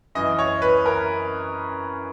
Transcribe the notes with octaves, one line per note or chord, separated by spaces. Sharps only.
F#2 E3 D#5
C#5
B4
A#4